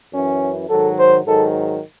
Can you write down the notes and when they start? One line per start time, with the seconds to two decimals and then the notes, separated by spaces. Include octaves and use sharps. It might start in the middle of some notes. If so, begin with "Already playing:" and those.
0.11 F#2 E3 C#4
0.68 G#2 D#3 F#3 A4
0.97 C5
1.25 G#2 D#3 F#3 A4